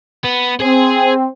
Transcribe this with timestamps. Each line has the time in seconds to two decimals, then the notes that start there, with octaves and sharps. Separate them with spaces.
0.24 B3
0.60 C4 G#4 G#5